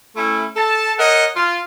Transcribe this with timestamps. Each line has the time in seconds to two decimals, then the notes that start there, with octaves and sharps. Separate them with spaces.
0.17 A3 C#4 E4
0.57 A4 A5
0.99 A#4 C#5 D#5 F#5
1.36 F4